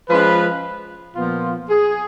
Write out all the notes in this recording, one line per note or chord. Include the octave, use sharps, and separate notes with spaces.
F3 G#3 C#4 F4 B4
A#2 F3 B3 F4
G#4